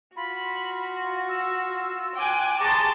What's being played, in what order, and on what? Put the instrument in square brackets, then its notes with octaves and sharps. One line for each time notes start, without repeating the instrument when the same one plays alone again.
[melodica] F4 [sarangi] F#4 [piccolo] B5
[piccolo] E6
[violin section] G5 G#5 F#6 [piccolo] D6
[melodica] G4 A#5 C#6 [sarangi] G#4 [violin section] A5 C6 [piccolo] A6